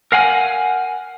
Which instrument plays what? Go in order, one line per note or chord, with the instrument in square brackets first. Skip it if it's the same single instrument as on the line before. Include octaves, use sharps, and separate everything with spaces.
[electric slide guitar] A#4 F5 F#5 G#5